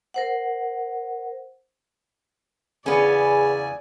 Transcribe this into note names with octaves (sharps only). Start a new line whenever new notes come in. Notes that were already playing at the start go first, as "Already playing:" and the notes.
A#4 C5 F#5
E2 C#3 B3 C#4 G#4 D5 G#5